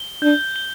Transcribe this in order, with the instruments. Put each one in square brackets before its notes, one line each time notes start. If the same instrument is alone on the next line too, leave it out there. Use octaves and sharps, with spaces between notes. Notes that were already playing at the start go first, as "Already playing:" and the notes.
Already playing: [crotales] G7
[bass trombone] D4 [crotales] G6
[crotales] G7